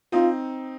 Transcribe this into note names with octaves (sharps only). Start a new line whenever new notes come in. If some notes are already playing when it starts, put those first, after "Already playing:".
C4 D#4 F4